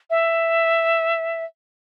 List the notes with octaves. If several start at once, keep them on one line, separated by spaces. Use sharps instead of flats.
E5